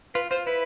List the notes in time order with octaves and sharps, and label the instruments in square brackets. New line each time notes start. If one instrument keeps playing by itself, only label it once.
[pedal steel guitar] F4 [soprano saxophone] B4
[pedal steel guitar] F4 [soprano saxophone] C5
[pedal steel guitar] E4 [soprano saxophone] B4